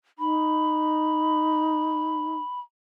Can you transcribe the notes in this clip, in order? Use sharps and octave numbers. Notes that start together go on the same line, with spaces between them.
D#4 B5